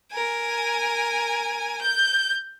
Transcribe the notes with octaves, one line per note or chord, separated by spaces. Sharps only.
A#4 G#5
G6